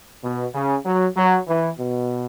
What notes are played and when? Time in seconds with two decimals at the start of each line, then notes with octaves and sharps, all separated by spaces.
0.23 B2
0.54 C#3
0.85 F#3
1.17 F#3
1.48 E3
1.79 B2